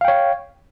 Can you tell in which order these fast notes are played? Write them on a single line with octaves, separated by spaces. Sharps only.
F5 G5 C#5